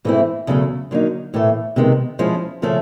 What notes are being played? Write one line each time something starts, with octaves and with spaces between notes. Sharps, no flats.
G#2 E3 A3 C4 E4
E2 C#3 F#3 A3
D3 F#3 A#3 D#4
A2 E3 A3
C3 D#3 G#3 B3
F3 G#3 C#4 E4
C#3 F3 A3 C#4